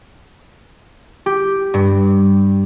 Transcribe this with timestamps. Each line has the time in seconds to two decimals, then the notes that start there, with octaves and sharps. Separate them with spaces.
1.26 G4
1.74 G2